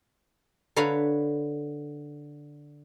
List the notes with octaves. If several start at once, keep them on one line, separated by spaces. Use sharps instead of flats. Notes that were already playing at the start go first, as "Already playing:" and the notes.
D3 B4 C#5 F5 A#5 B5